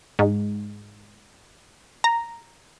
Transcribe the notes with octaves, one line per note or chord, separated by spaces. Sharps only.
G#2
A#5